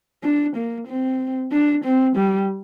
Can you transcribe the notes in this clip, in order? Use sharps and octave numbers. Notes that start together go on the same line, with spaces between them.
D4
A#3
C4
D4
C4
G3